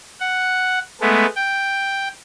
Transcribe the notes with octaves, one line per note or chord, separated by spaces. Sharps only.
F#5
G#3 A3 B3
G5